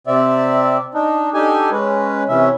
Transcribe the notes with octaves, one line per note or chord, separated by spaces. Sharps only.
C3 C4 D5 E5
D4 D#4
D4 D#4 G4 A4 G#5
G#3 C#4 B4
C3 E3 C#4 E5